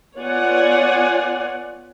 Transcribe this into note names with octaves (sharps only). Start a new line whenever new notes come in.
B3 F4 C#5 D5 F#5 G#5